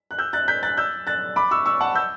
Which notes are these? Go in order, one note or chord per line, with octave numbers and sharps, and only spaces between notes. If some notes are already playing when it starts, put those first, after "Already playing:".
F#6
E6 G6
F#6 A6
G6 B6
F#6 A6
E6 G6
F#6 A6
B5 D6
C#6 E6
C#6 E6
F#5 A5
E6 G6